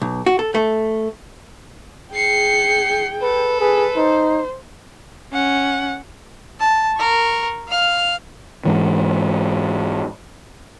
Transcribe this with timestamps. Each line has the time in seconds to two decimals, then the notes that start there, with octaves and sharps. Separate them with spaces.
0.02 B1
0.26 F#4
0.39 A4
0.55 A3
2.14 G#4 G5 C7 C#7
3.22 A4 B4
3.60 G#4 B4
3.96 D#4 C5
5.33 C#4 F#5
6.59 A5
6.97 A#4 C#6
7.68 F5 F6
8.65 G#2 E3